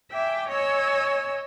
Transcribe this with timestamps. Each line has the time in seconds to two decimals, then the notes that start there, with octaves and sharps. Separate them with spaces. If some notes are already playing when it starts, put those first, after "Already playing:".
0.11 E5 G5 G#5 D6
0.49 C#5 D#5 G#5 E6